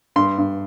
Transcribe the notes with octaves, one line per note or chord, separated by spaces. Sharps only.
G2 C6
G2